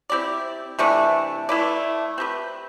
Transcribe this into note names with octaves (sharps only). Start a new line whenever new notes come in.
C4 E4 G4 D5
C3 E3 A3 D4
A3 E4 B4 D5
C4 G4 B4